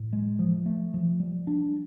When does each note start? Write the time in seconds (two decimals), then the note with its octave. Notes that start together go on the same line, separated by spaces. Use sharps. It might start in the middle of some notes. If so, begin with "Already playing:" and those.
Already playing: A2
0.13 G#3
0.39 F3
0.66 A3
0.94 F3
1.20 G3
1.47 D4